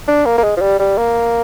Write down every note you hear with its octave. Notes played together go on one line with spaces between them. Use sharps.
D4
A#3
A#3
G#3
F3
G3
G3
A#3